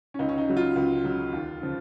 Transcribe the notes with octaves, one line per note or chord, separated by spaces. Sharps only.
C#4
C#2 D#4
C#4
D#4
C#3 F#3
F4
C#2
C#3 F#3
D#2
C#3 F3